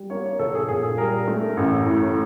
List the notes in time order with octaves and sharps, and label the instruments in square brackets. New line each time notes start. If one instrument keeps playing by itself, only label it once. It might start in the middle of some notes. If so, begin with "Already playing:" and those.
Already playing: [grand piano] G3
A#3 C#5
C#5
A#1 A4
G#4
A#2 G#4
G3 A#4
A3
A1
A2